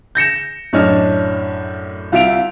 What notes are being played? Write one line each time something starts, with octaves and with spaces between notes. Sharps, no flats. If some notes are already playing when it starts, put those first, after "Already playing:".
G6 A#6 C#7 E7
F#2 A2 D4 C#5 D#5 F6
C2 F4 E5 D7 F7